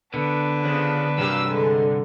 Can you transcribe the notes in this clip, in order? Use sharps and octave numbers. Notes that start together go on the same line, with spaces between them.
D3 B3 D4 B4
C#3 F3
G2 C3 F#3 A#3 G4 F5 E6
D3 G#3